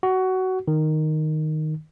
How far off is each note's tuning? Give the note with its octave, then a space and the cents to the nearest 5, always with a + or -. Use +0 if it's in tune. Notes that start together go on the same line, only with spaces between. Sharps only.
F#4 +15
D#3 -5